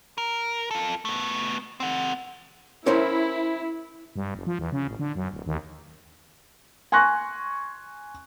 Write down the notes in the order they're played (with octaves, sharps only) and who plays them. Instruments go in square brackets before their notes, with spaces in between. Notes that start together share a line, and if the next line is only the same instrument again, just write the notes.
[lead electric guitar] A#4
F4 A4
A3 B3
C4 F#5
[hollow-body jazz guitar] C#4 A#4 C5 [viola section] E4
[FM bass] G2
F#1
F3
E2
C#3
A1
D3
F#2
D1
D#2
[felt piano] G#5 C6 C#6 F#6 A#6